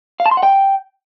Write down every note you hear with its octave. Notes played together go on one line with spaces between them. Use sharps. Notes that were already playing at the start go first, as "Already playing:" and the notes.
F5
A5
C6
F#5
G5